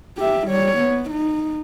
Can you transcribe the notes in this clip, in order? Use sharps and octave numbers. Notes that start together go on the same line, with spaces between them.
G4 E5
G3 C#5
B3
D#4